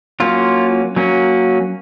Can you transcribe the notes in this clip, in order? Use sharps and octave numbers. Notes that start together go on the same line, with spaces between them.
F#3 A#3 C#4 F4
F#3 A#3 C#4